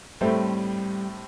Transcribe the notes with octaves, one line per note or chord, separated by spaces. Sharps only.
A2 G3 A3 C4